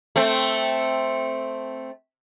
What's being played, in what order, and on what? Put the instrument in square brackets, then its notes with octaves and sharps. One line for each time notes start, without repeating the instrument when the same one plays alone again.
[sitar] A3 C4